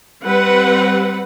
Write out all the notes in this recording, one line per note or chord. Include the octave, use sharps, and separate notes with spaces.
G3 C4 B4 F#5